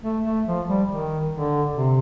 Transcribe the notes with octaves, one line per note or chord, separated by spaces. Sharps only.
A3
A3
F3
G3
D#3
D3
C3